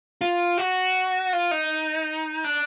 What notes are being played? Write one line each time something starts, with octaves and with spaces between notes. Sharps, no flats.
F4
F#4
F4
D#4
D4